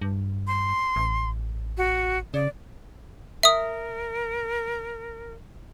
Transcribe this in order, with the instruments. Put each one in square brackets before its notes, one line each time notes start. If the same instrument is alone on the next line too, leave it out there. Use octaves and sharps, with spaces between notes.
[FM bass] G2
[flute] C6
[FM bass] A1
[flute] F#4
[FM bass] C#3 [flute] D5
[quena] A#4 [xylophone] E5 D#6